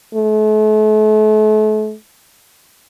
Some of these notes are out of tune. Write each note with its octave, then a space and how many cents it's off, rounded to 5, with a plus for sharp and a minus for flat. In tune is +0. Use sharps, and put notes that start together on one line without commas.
A3 -40